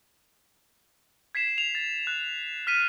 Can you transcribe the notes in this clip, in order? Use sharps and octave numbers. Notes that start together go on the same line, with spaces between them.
G#6 B6 C7 E7
F7
A6
F#6
F6 B6 D#7